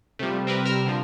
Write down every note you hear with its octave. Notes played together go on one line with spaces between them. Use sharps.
C3 F3 G3 A3
C4 A#4 B4
A#4 E6 F6
D3 F3